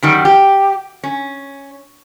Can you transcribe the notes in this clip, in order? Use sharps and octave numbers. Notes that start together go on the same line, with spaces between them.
F#2 D#3 G3
G4
C#4